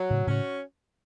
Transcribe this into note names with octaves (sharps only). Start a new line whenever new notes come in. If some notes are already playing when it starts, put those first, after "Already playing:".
Already playing: F#3
A2 C#3
A2 C#3 C#4 F#4 C#5